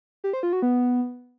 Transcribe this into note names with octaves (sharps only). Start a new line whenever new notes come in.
G4
C5
F4
F#4
B3